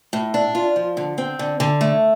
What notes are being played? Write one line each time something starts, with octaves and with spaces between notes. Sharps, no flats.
A2
D4
F4
F3
D3
C4
D3
D3
A3